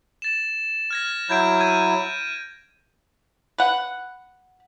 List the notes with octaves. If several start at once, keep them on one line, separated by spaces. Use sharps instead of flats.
A6 E7
F6 G#6 A#6
F#3 E4 G6 G#6 D7
F6 G#6 D#7
B4 F#5